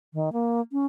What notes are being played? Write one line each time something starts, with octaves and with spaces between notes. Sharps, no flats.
D#3
A#3
C#4